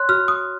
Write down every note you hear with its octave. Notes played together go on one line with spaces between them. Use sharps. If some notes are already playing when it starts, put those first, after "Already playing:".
Already playing: C#5 C6 F#6
F#4 F6
D#6